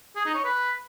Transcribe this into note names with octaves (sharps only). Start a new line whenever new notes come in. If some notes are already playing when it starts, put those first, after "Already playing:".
G#4
D#4
C#5
B4